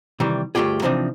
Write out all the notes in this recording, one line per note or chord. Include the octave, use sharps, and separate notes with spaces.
C3 D#3 E3 G3
D2 G2 A3 F4 G4 G#4
C3 E3 F3 C4 D4 D#4